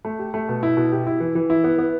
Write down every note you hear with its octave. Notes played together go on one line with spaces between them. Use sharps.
A3
G4
A3
B2
E4
B2
G4
E4
E3
E3
E4
B3
B3